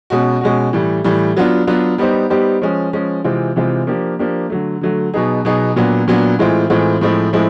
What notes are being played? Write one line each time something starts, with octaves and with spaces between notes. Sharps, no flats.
B2 G#3 C#4 F#4
B2 G#3 C#4 F#4
A2 E3 G3
A2 E3 G3
F#3 B3 D4 F4
F#3 B3 D4 F4
G3 B3 D#4 G4 C5
G3 B3 D#4 G4 C5
F3 G#3 C#4
F3 G#3 C#4
C3 E3 G#3 C4 F4
C3 E3 G#3 C4 F4
F3 A#3 D4 G4
F3 A#3 D4 G4
D3 F#3 A3
D3 F#3 A3
B2 F#3 B3 D#4 G#4
B2 F#3 B3 D#4 G#4
A#2 F#3 B3 D4
A#2 F#3 B3 D4
A2 E3 G#3 C4 F4
A2 E3 G#3 C4 F4
A2 F3 G#3 C4 E4
A2 F3 G#3 C4 E4